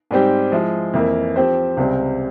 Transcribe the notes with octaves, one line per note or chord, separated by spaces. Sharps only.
G#2 G3 C4 G4
F3 G#3 E4
F2 E3 A#3 E4 A#4
F3 C4 G4 C5
C#2 C3 G3 C4